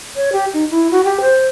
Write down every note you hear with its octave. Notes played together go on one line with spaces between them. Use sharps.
C#5
G4
D#4
E4
F#4
G4
C5